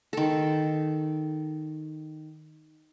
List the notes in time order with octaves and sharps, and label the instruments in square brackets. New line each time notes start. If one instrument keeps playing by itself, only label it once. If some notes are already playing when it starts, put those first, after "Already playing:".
[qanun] D#3 A4